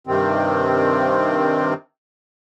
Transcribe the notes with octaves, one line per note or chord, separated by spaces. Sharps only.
G2 C3 D#3 C4